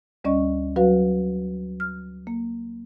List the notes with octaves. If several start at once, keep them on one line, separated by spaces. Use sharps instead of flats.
D2 G3 C#4 D5 D#5 C#6
F#3 F#4 B4 F5
F6
A#3